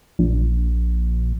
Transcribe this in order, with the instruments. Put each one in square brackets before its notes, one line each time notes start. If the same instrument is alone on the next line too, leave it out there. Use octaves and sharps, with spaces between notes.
[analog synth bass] A#1